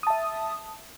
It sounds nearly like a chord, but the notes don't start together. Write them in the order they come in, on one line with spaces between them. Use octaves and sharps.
D#6 A5 E5